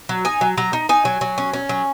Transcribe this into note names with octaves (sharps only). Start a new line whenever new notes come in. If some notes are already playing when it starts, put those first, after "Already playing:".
F#3
D#4 G#5
F#3
F#3 A#5
D#4
D#4 G#5
F#3
F#3
C#4
C#4
F#3